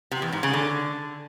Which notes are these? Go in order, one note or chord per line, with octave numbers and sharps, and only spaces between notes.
C3
E2
G#2
C#3
D3